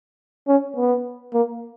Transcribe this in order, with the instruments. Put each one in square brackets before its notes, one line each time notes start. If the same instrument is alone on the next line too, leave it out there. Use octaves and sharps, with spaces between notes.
[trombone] C#4
B3
A#3